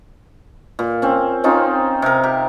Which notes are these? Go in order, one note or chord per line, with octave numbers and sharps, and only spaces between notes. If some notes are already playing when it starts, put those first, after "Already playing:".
A#2
C4 C#4
C4 C#4 D#4 F4
C3 A#4
G4